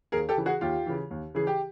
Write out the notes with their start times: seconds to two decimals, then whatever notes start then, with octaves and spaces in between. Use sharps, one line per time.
0.12 D#2 G#4 A#4
0.29 G4 A4
0.37 C#3 E3
0.46 F#4 G#4
0.61 D#2 F4 G4
0.86 C#3 E3
1.11 D#2
1.35 C#3 E3 G#4
1.47 G4